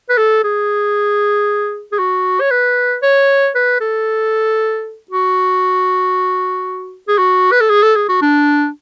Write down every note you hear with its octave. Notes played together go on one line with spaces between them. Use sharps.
B4
A4
G#4
G#4
F#4
C#5
B4
C#5
B4
A4
F#4
G#4
F#4
B4
A4
G#4
A4
G#4
F#4
D4